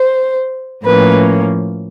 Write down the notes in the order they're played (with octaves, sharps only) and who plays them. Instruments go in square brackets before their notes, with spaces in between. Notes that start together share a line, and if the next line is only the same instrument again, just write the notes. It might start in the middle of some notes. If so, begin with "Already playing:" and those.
Already playing: [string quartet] C5
A2 F3 A#3 C#4 B4